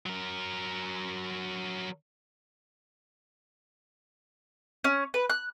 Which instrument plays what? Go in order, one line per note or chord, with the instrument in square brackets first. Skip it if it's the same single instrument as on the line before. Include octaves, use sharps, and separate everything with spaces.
[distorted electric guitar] F#3 A#4
[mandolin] C#4
B4
F#6